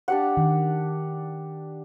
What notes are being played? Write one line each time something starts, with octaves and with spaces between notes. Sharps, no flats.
D4 G4 F#5
D#3